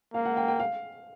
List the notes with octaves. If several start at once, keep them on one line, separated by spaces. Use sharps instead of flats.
A#3 F5
F#5
G5
G5
F5